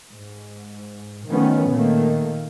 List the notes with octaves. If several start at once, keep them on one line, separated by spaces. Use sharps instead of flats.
G#2
D#3 F3 A3 B3 C#4
A#2 D#3 A3 A#3